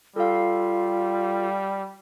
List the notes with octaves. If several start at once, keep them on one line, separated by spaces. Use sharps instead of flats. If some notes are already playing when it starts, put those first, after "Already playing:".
G3 F4 A4 F5